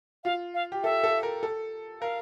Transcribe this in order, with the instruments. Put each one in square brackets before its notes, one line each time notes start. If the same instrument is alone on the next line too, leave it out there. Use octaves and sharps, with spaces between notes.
[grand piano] F4 [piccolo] F5
[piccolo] F5
[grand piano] G4
[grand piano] A4 [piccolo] E5
[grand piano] A4
A#4
A4
[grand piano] A#4 [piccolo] F5